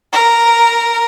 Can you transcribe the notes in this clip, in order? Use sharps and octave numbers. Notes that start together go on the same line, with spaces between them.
A#4